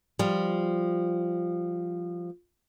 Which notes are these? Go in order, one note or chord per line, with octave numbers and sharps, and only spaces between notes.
F3 G3